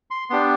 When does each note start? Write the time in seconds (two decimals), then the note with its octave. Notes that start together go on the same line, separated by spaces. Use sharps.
0.11 C6
0.30 B3 D4 G4 C6